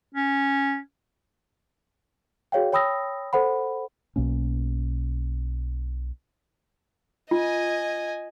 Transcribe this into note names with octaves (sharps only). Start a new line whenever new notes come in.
C#4
F#4 G#4 C#5 F5 G5
C#5 G5 B5 D#6 E6 A#6
A4 C5 F#5 B5
B1 B2 A#3 C#4
F4 D#5 G#5